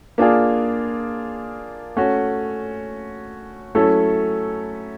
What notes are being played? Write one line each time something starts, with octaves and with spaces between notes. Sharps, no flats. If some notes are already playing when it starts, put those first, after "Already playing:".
A#3 D4 F4 G#4
A3 C#4 F#4
F#3 A3 C#4 E4 A4